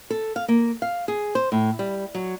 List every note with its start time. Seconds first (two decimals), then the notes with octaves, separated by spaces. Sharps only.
0.10 A4
0.36 F5
0.48 A#3
0.82 F5
1.08 G#4
1.35 C5
1.52 A2
1.79 G3
2.15 F#3